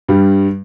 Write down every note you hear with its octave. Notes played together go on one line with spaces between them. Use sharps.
G2 G3